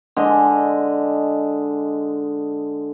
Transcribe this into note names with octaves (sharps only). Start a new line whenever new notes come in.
D3 G#3 D#5 D6